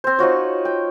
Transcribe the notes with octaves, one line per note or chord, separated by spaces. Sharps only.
C4 C5
D#4 F4 F#4 C#5
G5